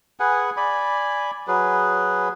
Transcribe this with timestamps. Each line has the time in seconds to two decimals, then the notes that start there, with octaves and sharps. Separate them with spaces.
0.20 G#4 B4 F#5 G#5
0.57 D5 G#5 B5
1.47 F#3 G#4 B4